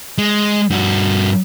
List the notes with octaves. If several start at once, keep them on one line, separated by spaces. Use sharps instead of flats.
G#3
G2 F#4